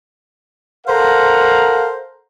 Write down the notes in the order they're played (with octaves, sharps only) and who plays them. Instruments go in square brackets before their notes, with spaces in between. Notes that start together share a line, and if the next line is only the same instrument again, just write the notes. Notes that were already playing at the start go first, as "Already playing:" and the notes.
[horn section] A4 A#4 C5 F5 F#5 A#5